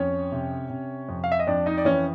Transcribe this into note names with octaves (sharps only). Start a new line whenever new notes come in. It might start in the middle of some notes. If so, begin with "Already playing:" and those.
Already playing: F2 C#4 C#5
C3
C3
F2
F5
E5
D#5
F2 D4 D5
D#4 D#5
D5
E3 C#4 C#5